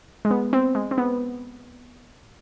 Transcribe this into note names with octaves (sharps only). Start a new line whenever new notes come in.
G#3
B3
C4
G#3
C4
B3